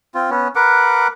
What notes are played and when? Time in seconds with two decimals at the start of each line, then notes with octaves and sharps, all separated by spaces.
0.15 C4 F4
0.30 B3 C#4
0.55 A#4 B4 F#5 D6